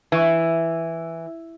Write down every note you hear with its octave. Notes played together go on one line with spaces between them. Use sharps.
E3